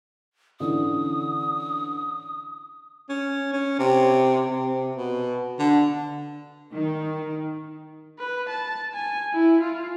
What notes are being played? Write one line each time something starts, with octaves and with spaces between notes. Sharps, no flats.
D3 E3 C#4 D#6
C#4
C#4
C3
C3
B2
D3
D#3
B4
A5
G#5
E4
F4